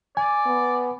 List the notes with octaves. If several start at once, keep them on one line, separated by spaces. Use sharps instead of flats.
D5 G#5
B3